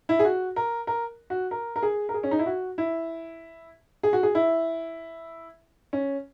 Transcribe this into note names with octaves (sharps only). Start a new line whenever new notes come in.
E4
G#4
F#4
A#4
A#4
F#4
A#4
A#4
G#4
A#4
G#4
C#4
D#4
E4
F#4
E4
G#4
F#4
G#4
E4
C#4